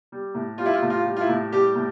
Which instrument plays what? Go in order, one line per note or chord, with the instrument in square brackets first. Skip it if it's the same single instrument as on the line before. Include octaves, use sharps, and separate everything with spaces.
[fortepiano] G3
A2
G3 F4
E4
F4
A2
F4
G3
F4
E4
A2
G3 G4
A2